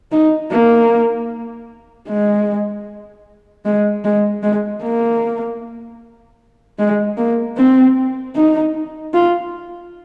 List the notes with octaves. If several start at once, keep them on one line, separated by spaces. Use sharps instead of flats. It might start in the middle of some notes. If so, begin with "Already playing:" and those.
D#4
A#3
G#3
G#3
G#3
G#3
A#3
G#3
A#3
C4
D#4
F4